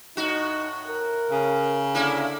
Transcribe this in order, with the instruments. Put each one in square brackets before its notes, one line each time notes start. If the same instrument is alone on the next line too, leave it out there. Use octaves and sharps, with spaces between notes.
[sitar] A2 F#4 [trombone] D#4
[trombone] A#4
[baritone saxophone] C#3
[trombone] D3 [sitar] A#3 E4